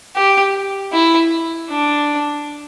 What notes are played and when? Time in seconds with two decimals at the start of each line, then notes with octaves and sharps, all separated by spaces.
0.16 G4
0.93 E4
1.70 D4